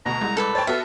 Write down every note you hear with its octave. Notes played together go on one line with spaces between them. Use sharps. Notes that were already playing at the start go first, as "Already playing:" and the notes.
D2 B2 A#5
C2 G#3
A4 B4 D5
C5 C#5 G5 A5
B3 F4 F#4 A4 E5